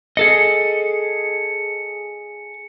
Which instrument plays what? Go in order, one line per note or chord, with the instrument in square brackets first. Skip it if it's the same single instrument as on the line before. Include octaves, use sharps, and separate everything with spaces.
[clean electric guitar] G#4 A4 D#5 [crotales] C#7